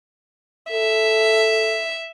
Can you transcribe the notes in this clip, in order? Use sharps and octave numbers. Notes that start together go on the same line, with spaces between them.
A4 E5